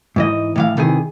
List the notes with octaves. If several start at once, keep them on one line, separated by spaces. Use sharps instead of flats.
G#2 E3 D#5
A2 E3 F5
C3 D#3 E3 G#4